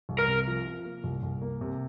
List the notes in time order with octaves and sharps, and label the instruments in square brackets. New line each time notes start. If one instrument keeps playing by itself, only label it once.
[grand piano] C2
[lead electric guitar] A#4
[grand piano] C3
F3
F3
A#3
C2
C2
A#3
C3